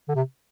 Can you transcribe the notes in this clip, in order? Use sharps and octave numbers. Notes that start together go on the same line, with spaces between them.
D3
C3